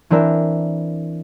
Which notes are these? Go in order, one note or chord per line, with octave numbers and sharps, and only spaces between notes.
E3 C4 D4 A#4 E5